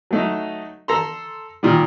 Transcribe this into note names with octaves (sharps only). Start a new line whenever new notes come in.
F#3 A3 D#4
A4 A#5 C6
A#2 D#3 G3